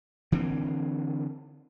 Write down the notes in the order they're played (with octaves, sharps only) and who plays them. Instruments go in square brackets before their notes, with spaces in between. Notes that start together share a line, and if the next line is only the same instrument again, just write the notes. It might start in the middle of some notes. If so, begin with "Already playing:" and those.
[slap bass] D3 E3 A#3 C4